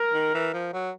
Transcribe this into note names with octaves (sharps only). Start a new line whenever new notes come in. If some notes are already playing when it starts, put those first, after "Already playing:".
Already playing: A#4
D#3
E3
F3
F#3